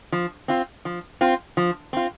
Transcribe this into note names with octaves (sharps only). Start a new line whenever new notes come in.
F3
C4 F4
F3
C4 F4
F3
C4 F4